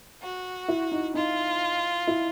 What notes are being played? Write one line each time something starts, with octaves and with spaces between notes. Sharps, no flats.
F#4
E4
D#4
D#4 F4
E4